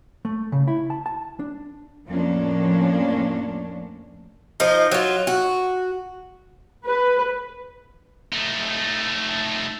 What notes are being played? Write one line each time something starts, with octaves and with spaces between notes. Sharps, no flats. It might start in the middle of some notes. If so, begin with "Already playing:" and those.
A3
C#3
E4
A5
A5
D4
F2 A2 F3 A#3 C#4 D4
F3 D#4
F#3 F4
F#4
B4
A3 D#4